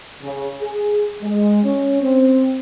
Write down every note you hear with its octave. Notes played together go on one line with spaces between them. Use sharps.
C#3
G#4
G#3
C#4
C4